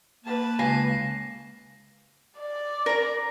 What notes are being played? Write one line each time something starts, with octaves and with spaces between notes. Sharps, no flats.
A#3 B4 A5
C#2 F5 G#5 A#6 C7
D5
A#4 A#5